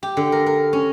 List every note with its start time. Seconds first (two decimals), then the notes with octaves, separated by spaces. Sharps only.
0.03 G4
0.17 D3
0.32 A#4
0.46 A#4
0.73 C#4